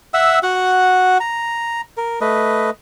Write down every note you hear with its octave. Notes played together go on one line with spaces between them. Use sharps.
E5 F#5 E6
F#4 F#5
A#5
A#4
A3 B4 D#5